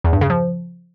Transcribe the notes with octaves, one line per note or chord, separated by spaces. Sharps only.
E2
G2
C#3
F3